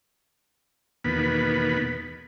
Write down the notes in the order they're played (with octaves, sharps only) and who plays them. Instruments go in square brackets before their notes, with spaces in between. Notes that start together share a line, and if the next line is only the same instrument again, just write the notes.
[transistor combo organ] E2 B2 D#3 A#3 B3 B5